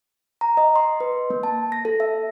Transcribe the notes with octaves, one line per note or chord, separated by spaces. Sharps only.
A#5
D#5
C6
B4
A#3
A5
A#6
A4
E5